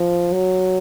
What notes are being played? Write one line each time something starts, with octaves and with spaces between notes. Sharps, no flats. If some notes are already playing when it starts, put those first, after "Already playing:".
Already playing: F3
F#3